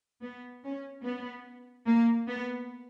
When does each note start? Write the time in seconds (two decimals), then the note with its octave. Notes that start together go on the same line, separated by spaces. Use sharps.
0.22 B3
0.64 C#4
1.04 B3
1.87 A#3
2.28 B3